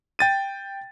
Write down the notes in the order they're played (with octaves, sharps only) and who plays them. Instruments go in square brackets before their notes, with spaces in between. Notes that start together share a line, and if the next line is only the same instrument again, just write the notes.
[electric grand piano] G5 A6 D#7